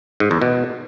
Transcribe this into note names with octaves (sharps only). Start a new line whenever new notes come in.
G#2
E2
B2